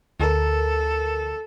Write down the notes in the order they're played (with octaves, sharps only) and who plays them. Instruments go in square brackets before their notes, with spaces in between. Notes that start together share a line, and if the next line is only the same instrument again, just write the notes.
[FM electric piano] D2 A#4 [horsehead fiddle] A4